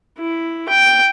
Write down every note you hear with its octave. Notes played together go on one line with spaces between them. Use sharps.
E4
G5